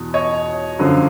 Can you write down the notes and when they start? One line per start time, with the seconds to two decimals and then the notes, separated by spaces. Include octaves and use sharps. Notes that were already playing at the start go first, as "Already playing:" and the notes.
Already playing: E2 B2
0.14 C#5 D#5
0.79 F#2 D3 F3